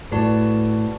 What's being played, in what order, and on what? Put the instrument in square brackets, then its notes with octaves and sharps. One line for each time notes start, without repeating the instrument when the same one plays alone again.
[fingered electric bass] A2 [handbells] F#4 B4 D5 A5